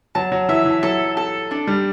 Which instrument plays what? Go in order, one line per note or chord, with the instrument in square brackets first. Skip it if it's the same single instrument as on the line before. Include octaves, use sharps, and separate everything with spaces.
[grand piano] F#3 [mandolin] A5
[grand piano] F#3
[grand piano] E3 [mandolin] E5
[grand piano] E3
[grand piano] F#3 [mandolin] A4
[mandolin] A4
D4
[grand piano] G3